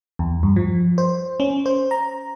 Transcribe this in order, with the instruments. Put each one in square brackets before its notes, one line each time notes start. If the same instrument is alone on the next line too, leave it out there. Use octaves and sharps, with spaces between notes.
[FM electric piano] E2
G2
F3
C5
C#4
C5
A#5